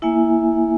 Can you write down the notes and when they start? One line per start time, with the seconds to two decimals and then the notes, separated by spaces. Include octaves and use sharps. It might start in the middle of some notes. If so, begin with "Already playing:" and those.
0.02 A#3 E4 E5 G#5